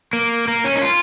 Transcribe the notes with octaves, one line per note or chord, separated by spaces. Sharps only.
A#3
A#3
C#4
D#4
F4